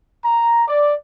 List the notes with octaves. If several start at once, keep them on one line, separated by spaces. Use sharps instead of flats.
A#5
D5